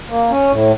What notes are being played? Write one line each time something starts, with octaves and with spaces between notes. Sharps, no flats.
A#3
C#4
A2